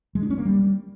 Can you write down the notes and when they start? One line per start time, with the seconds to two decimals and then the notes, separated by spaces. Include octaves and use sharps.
0.15 G#3
0.23 D4
0.30 C#4
0.38 A#3
0.45 G3